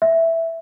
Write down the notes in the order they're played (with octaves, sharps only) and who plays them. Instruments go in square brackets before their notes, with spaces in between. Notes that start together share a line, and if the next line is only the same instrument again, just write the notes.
[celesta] E5